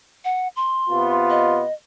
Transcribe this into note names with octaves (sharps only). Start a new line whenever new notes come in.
F#5
C6
C3 B3 F4
D#5